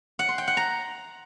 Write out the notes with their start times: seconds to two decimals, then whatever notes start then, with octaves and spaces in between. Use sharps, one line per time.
0.19 F#5
0.29 C6
0.38 G5
0.48 F#5
0.57 A#5